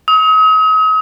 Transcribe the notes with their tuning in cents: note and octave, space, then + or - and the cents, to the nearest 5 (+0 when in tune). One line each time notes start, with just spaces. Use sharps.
D#6 +40